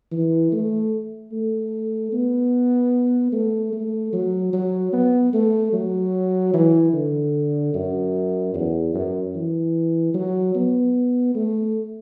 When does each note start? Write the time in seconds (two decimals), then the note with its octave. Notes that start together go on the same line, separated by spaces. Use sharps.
0.12 E3
0.52 A3
1.32 A3
2.13 B3
3.32 A3
3.73 A3
4.13 F#3
4.53 F#3
4.93 B3
5.33 A3
5.73 F#3
6.54 E3
6.93 D3
7.74 F#2
8.54 E2
8.94 F#2
9.35 E3
10.14 F#3
10.55 B3
11.35 A3